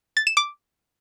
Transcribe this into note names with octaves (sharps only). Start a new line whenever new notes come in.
A6
E7
D6